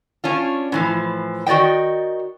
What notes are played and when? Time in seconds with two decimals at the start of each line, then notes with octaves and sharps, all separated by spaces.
0.24 C#4 D4 F4
0.72 A2 E3 F3
1.47 D#3 F#4 D5 D#5 G5